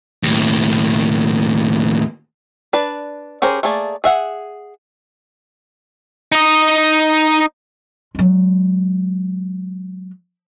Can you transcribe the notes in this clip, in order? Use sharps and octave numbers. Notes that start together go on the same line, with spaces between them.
D#2 A2
D4 B4 D5
C#4 G4 G#4 A#4 C5
A3 A#3 G#4 D5
G#4 E5 F#5
D#4 D#5
F#3 G#3